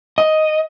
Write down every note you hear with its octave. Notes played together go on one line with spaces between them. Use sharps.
D#5